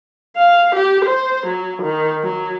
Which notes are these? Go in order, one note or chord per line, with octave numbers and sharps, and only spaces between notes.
F5
G4
C5
F#3
D#3
F#3